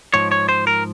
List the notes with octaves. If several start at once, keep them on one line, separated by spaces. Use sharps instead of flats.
G#2 F3 C#5
C#5
C5
A#4